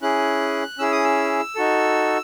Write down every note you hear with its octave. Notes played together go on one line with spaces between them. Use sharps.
C#4 E4 G#4 F#6
C#4 E4 G#4 E6
D#6
E6
D#4 F#4 A4